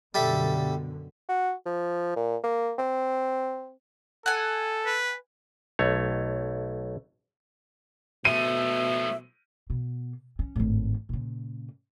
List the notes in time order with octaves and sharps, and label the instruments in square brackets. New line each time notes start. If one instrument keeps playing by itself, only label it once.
[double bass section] F#2 B2 D3 [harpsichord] G3 A4 E5
[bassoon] F#4
F3
A#2
A#3
C4
[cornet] A4 [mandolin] F#5 G#5
[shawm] B4
[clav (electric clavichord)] B1 A3 C#5
[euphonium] B2 [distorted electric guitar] F3 A3 [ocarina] E5 [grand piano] D#7
[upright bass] B2
C#4
G#1 A2
A#2 C#3